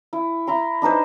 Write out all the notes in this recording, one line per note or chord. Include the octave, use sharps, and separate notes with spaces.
E4
E4 A#5 C6
D4 D#4 B4 C5